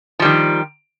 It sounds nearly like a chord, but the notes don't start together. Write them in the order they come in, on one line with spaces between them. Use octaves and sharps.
F3 G3 D#3